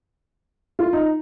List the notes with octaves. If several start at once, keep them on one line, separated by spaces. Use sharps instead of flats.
F4
D#4